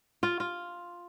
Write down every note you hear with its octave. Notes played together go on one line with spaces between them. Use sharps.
F4
F4